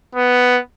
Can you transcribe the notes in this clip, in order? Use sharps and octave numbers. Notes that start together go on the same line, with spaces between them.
B3